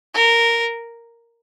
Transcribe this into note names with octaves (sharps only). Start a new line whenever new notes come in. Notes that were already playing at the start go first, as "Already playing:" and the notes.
A#4